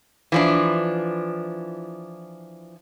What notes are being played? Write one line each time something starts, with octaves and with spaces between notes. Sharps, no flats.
E3 F3 D4